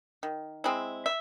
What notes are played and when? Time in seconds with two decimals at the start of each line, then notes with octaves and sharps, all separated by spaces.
0.23 D#3
0.64 G#3 C4 E4
1.06 E5